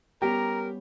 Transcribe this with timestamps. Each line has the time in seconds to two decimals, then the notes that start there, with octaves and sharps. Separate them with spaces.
0.22 G3 B3 C#4 G4 A#4 A#5